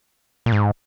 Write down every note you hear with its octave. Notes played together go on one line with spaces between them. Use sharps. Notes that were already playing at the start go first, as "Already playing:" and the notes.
A#2
G#2